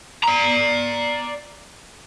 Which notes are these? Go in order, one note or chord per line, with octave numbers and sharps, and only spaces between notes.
D5 A#5